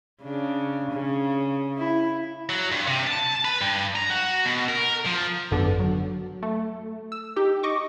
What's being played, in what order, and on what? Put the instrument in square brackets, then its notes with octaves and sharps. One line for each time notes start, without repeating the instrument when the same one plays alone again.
[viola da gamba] C#3 D4
C#3
E4
[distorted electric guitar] F#3
G2
C3
A5
B4
G2
A#5
F#4
B2
A#4
F3
[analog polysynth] G#1 F#2 D3 B3 D4 A4
F#3
A3
E6
D#4 G4
D#5 C#6 D6